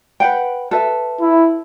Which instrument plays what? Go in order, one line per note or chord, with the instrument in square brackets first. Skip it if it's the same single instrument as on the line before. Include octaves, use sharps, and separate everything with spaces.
[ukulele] B4 F#5 G5
A4 B4 E5
[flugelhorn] E4